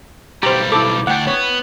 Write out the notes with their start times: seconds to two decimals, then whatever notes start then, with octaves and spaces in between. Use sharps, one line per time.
0.43 B1 G3 G4 C5 A#5
0.72 E4 A4 D6
1.07 D2 D4 F#5 G5
1.27 B3 C#5